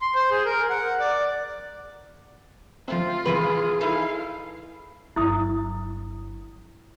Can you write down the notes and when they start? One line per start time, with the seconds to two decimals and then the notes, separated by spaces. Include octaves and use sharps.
0.01 C6
0.15 C5
0.31 G#4
0.45 A#4
0.70 F#5
1.00 D5
2.88 F3 A3 C4 F4
3.25 C3 E3 B3 G#4 B4
3.81 D#4 E4 A4 F5
5.16 G1 F#3 E4 D#6